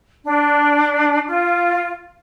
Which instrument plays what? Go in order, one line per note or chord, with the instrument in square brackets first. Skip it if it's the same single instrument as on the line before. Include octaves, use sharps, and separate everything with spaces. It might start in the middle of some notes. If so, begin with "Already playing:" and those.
[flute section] D4
F4